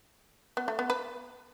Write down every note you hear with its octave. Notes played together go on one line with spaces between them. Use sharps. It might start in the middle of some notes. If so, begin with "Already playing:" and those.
B3
A3
B3
B4